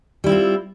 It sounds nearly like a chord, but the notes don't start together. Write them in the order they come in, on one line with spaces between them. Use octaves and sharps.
G3 E4 C4 F4